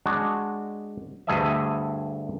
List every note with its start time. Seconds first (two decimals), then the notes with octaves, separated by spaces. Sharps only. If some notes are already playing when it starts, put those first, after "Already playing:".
0.06 G#3 D4 F#4
1.27 D2 G2 G#4 A4 D#5 E5